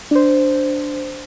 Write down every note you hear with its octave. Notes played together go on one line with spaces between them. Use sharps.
D4 C5